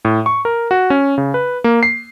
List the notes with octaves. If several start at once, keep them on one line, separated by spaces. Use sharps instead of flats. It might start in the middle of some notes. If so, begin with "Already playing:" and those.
A2
C#6
A#4
F#4
C#4
C#3
B4
A#3
C7